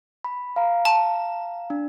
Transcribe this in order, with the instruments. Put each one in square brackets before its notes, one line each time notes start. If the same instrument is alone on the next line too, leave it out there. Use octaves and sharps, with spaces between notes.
[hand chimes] B5
F5 A#5
[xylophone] A5
[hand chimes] D4